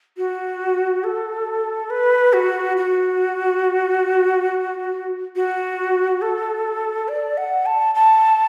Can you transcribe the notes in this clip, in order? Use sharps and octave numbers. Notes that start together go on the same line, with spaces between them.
F#4
A4
B4
F#4
F#4
F#4
A4
D5
F#5
A5
A5